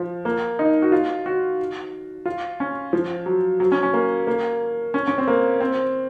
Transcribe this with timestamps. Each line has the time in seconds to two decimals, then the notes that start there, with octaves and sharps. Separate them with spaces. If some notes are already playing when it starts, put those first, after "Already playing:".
Already playing: F3
0.25 A#3
0.59 D#4
0.82 F#4
0.92 F4
1.26 F#4
2.26 F4
2.60 C#4
2.93 F3
3.26 F#3
3.60 F#3
3.72 C#4
3.83 C#4
3.94 A#3
4.27 A#3
4.94 C#4
5.08 C#4
5.18 C4
5.28 A#3
5.60 C4